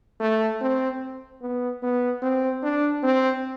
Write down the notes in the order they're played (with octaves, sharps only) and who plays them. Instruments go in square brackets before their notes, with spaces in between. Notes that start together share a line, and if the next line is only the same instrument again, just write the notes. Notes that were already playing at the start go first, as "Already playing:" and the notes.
[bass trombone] A3
C4
B3
B3
C4
D4
C4